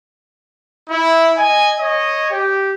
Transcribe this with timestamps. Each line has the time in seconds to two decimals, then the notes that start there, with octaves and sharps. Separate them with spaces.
0.89 E4
1.37 D#5 G#5
1.79 C#5 D#5
2.31 G4